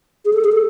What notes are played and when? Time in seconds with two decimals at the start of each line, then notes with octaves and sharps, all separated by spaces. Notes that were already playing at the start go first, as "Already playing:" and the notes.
0.25 G#4
0.33 A4
0.44 G#4
0.52 A4